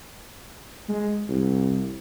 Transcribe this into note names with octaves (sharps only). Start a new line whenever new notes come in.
G#3
C2